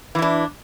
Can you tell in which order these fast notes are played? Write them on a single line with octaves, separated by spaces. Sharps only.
E3 E4 D4